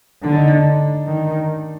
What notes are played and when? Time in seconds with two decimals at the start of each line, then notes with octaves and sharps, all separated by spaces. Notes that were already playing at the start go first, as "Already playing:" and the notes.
0.23 D3 D4
0.35 D#4
0.48 D4
1.07 D#3